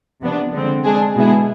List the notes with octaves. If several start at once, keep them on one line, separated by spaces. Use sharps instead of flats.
C3 F3 B3 D4
D3 G#3 C4
G#3 D4 G#4
B2 G#3 B3 E4 G#4